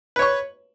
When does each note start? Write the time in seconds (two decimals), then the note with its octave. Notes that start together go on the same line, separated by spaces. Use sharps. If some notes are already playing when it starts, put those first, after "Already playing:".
0.16 B4
0.19 C#5
0.22 C#6